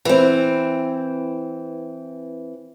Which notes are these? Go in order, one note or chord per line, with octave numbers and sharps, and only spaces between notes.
E3 C4